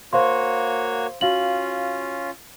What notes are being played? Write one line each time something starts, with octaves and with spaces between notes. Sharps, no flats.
A#3 F#4 C5 C#5 F5 C6
C#4 F4 F#4 F5 F#7